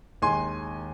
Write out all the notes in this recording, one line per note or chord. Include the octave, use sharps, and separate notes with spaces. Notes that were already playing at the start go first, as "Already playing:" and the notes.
D#2 D#3 G#3 G#5 C6